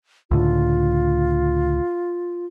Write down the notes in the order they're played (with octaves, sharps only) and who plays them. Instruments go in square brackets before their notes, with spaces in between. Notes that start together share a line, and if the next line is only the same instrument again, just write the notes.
[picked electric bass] C#2 A2 D3 [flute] F4